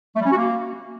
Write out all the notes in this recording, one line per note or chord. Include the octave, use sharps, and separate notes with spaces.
A3
G3
C#4
F#4
A#3